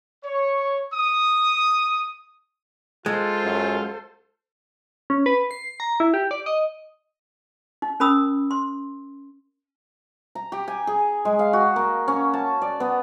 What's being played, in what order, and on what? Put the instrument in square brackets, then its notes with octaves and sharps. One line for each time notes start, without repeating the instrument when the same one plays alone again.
[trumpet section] C#5
D#6
[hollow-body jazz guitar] G#3 [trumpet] F4 [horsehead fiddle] A4 C5
[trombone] F#2
[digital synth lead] C#4
B4
C7
A#5
E4
G4
D5
D#5
[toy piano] D#4
C#4 A#4 B5 D#6 E6
C6
[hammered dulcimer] A#5
G4
G#5
G#4
G#3
F5
F#4
A#3
C#4
A5
D5
B3